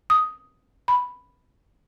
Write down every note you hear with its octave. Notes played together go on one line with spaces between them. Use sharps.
D#6
B5